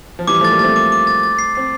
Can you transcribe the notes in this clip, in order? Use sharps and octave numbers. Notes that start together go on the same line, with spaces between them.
F3
E3 G3 D6
F3 A3 A6
G3 A#3
A3 C4 A6
D6
D6
A6
A6
C7
C4 C7